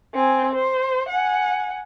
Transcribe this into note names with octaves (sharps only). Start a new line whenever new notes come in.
C4 G#5
C5
F#5 G#5